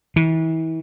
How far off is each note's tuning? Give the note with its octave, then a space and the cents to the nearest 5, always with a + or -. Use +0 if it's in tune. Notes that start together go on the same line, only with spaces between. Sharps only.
E3 -35